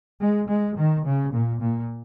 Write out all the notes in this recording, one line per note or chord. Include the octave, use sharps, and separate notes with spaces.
G#3
G#3
D#3
C#3
A#2
A#2